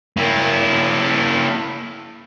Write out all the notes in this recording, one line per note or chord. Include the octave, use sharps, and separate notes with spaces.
A#3 E4